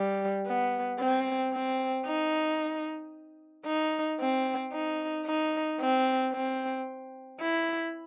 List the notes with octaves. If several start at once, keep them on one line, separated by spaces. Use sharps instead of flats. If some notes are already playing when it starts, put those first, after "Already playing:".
Already playing: G3
B3
C4
C4
D#4
D#4
C4
D#4
D#4
C4
C4
E4